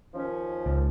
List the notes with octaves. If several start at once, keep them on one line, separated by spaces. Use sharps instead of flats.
D#2 F3 C#4
C#2